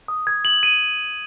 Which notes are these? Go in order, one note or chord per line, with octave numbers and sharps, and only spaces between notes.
D#6
G#6
F#7
D#7